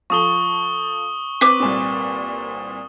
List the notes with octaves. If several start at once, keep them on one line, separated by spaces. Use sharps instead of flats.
F3 A4 C#6 D#6 G7
C4 B4 D6
C2 A#2 C4